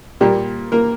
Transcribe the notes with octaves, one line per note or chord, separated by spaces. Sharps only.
A#2 G3 A#3 G4
A#3 A#4